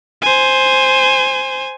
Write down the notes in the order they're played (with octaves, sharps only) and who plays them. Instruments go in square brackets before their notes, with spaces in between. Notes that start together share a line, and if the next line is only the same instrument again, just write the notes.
[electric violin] C5 G#5